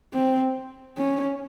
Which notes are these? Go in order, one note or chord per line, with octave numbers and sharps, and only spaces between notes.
C4
C#4